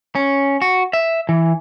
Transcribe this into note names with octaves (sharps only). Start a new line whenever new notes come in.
C#4
F#4
E5
E3